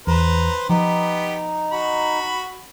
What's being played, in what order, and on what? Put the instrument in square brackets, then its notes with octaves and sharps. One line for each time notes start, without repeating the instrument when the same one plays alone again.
[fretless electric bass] E2 [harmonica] B4 C5 [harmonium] A#5
[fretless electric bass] F3 [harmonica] B3 G4 [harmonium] D#4
[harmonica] F#4 B5